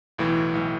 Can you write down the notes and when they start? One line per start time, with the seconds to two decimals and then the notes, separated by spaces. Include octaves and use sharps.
0.18 B1 A2 E3
0.53 B1 A2 E3